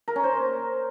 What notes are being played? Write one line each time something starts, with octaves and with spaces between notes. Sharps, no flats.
A#4
C#4
C5